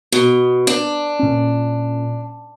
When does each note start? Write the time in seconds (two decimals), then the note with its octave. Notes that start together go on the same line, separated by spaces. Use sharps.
0.12 B2
0.67 D4
1.19 A#2 C#4